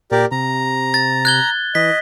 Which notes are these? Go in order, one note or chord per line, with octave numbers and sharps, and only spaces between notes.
A#2 G4 A#4 D5
C3 A#5
A6
F#6 G#6 G7
E3 D#5 B6